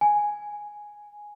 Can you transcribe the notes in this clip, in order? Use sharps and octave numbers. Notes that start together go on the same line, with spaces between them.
G#5